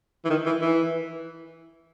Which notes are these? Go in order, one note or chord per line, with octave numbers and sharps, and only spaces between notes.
E3
D#3
E3
E3